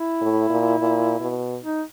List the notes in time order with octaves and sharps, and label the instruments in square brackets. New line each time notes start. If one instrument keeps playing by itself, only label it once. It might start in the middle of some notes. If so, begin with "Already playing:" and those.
Already playing: [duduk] E4
[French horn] A2
A#2
A#2
B2
[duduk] D#4